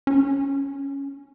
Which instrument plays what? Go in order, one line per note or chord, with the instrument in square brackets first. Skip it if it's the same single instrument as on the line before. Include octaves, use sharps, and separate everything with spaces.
[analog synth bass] C#4